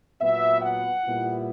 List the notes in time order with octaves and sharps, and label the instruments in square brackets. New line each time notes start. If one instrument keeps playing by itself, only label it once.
[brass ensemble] A#2 F#3 B3 E5
F#5
A#2 G3 B3 E4